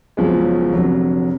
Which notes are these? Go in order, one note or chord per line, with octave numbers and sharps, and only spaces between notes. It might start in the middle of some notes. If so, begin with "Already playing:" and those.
F#1 F#2 F3 G#3 B3
F1 F2 D3 F#3